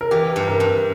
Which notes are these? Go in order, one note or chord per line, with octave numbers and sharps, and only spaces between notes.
A#4
E3 G4
G2
A#4
G2